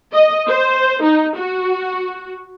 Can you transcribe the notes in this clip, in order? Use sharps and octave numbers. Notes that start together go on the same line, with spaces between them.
D#5
C5
D#4
F#4